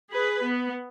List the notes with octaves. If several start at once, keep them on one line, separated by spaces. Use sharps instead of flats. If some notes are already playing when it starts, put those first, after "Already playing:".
G#4 B4
B3